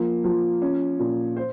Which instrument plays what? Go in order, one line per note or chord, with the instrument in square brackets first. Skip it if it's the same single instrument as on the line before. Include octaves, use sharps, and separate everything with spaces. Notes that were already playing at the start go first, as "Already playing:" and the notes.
Already playing: [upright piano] F3 A#3
F3
C#4
A#2
C5